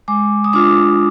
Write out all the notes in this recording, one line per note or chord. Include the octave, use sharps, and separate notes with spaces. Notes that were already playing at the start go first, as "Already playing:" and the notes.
G#3 D6
D#6
D4 F4 D6